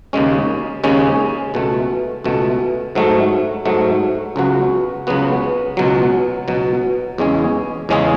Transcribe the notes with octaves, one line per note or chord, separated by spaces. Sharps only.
D#2 C#3 G#3 C#4
D#2 C#3 G#3 C#4
C#2 B2 A3
C#2 B2 A3
G#2 F#3 A3
G#2 F#3 A3
C#2 C#3 F#3 B3 F#4
C#2 C#3 F#3 B3 F#4
C#2 B2 F#3
C#2 B2 F#3
E2 C#3 G#3 C#4 G#4
E2 C#3 G#3 C#4 G#4